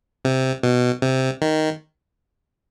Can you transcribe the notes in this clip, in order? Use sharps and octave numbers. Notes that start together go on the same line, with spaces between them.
C3
B2
C3
D#3